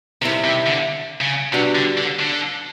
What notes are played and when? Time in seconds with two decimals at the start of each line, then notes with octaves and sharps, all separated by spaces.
0.22 C3 D#3 G3 C4 E4
0.44 C3
0.66 D3
1.21 C#3
1.53 C3 G3 B3 D4 F#4
1.75 D3
1.97 D3
2.19 D3